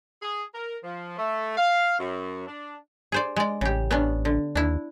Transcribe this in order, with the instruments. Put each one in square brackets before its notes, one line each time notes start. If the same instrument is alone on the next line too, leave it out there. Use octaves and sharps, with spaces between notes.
[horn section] G#4
A#4
F3
A3
F5
F#2
D4
[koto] G#4 C5 D5
G#3 D5
[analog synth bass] A1 [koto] C#3 G4
[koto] B3 C#4 D4
D3
[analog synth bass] D#2 [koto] D4 E4